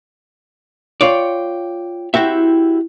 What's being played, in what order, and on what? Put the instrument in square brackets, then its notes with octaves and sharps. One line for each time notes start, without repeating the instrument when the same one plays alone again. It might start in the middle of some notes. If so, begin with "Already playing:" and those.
[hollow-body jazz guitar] F4 C#5 D5 [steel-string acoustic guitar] G5
[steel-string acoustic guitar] C4 E4 [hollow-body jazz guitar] F#4 G4 E5